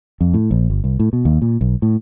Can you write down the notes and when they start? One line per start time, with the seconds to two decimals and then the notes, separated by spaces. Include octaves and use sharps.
0.21 F2
0.34 A2
0.51 A#1
0.70 G1
0.84 C2
1.00 A2
1.13 B2
1.25 D#2
1.42 A#2
1.61 B1
1.82 A2